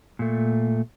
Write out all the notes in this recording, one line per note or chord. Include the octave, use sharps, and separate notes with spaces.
A#2 A3